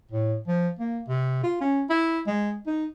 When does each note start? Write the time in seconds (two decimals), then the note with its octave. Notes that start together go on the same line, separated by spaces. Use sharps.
0.11 A2
0.48 F3
0.79 A#3
1.08 C3
1.43 F4
1.61 C#4
1.90 E4
2.27 G#3
2.67 D#4